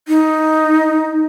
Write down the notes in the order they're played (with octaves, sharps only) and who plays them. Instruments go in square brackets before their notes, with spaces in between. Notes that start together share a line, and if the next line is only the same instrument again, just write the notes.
[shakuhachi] D#4